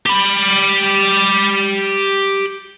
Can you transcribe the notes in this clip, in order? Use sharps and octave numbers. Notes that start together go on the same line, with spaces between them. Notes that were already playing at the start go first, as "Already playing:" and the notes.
G4 B5